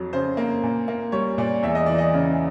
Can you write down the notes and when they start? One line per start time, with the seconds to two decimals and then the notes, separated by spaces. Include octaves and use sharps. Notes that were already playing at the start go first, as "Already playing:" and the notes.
Already playing: F2 F#3
0.13 C#3 C5
0.37 A#3
0.63 A#2
0.88 A#3
1.12 G3 C#5
1.38 A#2 D5
1.63 E2 E5
1.75 D#5
1.86 E3 D5
1.98 D#5
2.13 C#3